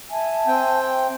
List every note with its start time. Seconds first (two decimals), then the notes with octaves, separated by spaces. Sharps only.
0.11 E5 G#5 A5
0.47 C4 G5